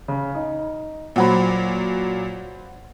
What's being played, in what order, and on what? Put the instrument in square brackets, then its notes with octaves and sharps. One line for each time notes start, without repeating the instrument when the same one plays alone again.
[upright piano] C#3
D#4
[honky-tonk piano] A#2 F#3 [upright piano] C5 F#5 B5